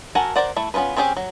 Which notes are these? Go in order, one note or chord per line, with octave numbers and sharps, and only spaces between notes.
F#4 A4 A#4 F#5 G#5
A#4 C5 D5 F#5
A3 E4
B3 C#4 F4 A#4 B4
C4 C#4 E4 G4 G#4
F#3